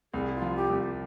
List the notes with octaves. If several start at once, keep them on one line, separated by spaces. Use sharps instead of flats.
C2 G#4
F4
F3
G4
C2